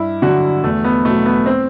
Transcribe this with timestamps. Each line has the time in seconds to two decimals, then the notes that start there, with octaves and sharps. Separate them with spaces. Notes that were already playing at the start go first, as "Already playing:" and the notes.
Already playing: G2 E4
0.22 D3 F#3 F#4
0.63 E2 A3
0.84 B3
1.05 B2 F#3 A3
1.26 B3
1.46 C4